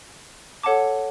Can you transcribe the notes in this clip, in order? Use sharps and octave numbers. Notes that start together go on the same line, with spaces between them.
A4 C#5 F#5 A5 D6